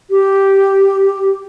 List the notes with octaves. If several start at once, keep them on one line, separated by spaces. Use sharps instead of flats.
G4